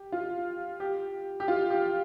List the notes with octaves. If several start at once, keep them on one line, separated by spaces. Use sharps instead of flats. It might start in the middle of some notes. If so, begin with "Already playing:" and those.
Already playing: G4
F4
G4
G4
F4
G4